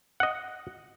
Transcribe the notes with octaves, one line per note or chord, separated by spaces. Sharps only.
D#5 F#5